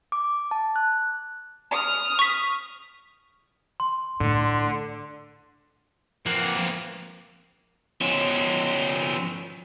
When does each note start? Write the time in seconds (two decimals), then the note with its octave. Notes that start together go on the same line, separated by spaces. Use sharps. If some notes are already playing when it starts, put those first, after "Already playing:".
0.12 D6
0.51 A5
0.76 F#6
1.71 D#6 F6
2.19 C#6 B6
3.80 C6
4.20 A2 D3
6.26 F3 A#3 C4 F#5
8.01 F3 C#4